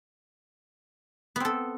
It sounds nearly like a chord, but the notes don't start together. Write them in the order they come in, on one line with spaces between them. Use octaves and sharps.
B3 C4 A4